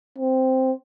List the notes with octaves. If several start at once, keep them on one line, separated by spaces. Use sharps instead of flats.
C4